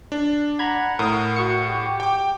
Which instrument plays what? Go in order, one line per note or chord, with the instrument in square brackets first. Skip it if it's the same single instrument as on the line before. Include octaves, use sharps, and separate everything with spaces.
[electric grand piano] D4
[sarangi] F#5 [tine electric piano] A#5 B5 G#6
[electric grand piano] A2 [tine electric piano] A#4 D#6
[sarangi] F#4 [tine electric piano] C#6 C#7
[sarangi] G4
[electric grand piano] G5 D6